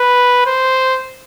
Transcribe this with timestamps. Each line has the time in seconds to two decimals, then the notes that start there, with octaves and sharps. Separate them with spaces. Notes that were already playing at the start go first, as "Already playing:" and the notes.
Already playing: B4
0.47 C5